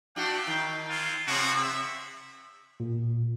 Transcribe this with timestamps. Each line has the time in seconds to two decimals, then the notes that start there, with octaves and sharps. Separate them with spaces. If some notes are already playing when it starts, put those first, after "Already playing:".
0.16 A3 D4 F#4 F5 G5
0.47 D#3
0.88 G#3 C4 F4
1.27 C3 C4 C#4 F4 F#4
1.62 E5
2.80 A#2